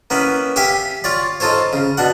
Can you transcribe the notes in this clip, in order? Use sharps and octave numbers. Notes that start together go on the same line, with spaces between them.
A#3 B3 C#4 E4
G4 E5 F5 G5 G#5
F4 C#5 D5
D#4 F4 A4 C5 C#5
C#3
B2 D4 F#5